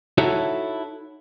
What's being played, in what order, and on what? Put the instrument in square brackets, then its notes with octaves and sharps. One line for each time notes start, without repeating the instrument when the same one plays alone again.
[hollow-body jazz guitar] D#4 E4 F#4 A4 C#5 E5